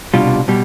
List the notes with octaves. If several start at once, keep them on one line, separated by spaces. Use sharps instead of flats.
C2 B2 G3 D4 F4
B2 G3